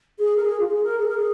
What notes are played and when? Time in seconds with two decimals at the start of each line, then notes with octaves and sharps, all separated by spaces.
0.19 G#4
0.36 A#4
0.43 G#4
0.60 F4
0.67 G#4
0.84 A#4
0.99 G#4
1.08 A#4
1.17 G#4